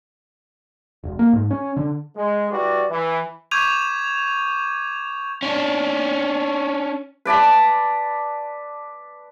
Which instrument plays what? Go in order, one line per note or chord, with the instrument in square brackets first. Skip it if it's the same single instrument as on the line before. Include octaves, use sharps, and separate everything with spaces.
[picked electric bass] E1
A#3
G#2
C#4
D3
[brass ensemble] G#3
G3 E4 F#4 B4 D5
E3
[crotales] C#6 D6 G6 G#6 D#7 F7
[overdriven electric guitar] C#4 D4
[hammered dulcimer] B4 D5 A5 B5